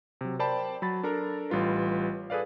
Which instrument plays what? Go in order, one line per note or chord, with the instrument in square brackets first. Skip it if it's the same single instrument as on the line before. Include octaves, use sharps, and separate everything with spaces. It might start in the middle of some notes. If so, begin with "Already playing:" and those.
[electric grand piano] C3 F#3
A#4 C5 D5 G5 A5 B5
F#3 B5 A6
D4 A4 A#4 A#5
A1 G3 F4 B4
G#4 A4 B4 D5 F5